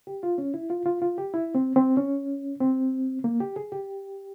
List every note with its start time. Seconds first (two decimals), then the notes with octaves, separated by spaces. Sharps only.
0.07 G4
0.23 F4
0.38 C#4
0.54 E4
0.70 F4
0.86 F4
1.02 F4
1.18 G4
1.34 E4
1.55 C4
1.76 C4
1.97 C#4
2.61 C4
3.24 A#3
3.40 G4
3.56 G#4
3.72 G4